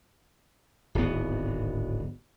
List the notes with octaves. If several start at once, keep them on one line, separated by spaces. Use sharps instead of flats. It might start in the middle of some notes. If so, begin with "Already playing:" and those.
D1 G#1 B3